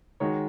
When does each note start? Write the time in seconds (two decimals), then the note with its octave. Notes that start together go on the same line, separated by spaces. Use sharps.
0.20 D#3 G#3 D#4 F#4 C#5